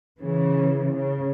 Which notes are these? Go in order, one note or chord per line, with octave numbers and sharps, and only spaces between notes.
C#3 E3
C#3